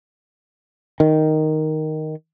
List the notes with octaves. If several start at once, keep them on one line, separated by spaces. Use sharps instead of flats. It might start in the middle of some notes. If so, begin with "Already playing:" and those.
D#3